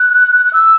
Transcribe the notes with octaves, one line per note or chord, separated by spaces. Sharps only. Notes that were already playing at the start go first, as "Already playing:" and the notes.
Already playing: F#6
F#6
E6